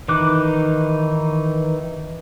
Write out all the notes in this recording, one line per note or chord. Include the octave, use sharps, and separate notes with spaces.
D#3 E3 D#4 D6 F#6